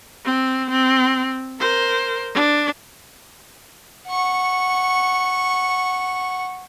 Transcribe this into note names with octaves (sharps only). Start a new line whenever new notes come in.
C4
C4
A#4 C5
D4
F#5 C#6